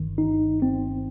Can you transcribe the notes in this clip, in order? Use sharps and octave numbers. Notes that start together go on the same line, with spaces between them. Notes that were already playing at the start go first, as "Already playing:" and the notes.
Already playing: G1 G2 D#3
D#4
C4